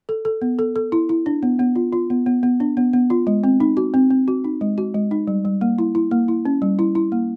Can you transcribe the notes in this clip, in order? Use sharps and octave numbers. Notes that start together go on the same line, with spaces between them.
A4
A4
B3
A4
A4
E4
E4
D4
B3
B3
F4
F4
B3
B3
B3
D4
B3
B3
F4
G#3
C4
D#4
F#4
C4
C4
F#4
D#4
G#3
F#4
G#3
D#4
G3
G3
A#3
E4
E4
A#3
E4
C#4
G3
E4
E4
A#3